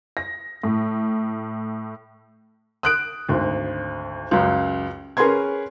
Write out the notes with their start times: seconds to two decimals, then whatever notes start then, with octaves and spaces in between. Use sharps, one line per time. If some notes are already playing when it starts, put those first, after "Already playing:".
0.17 A#6
0.63 A2
2.83 D#6 F#6 D7
3.29 G#1 D2
4.31 C#2 F#2
5.17 C#4 G#4 A#4 B4 C6 G#6